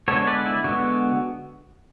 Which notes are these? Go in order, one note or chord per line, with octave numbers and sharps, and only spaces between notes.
D3 G#3 B3 A4 C#5
B4 D5
E4
D3 G#3 B3 F#4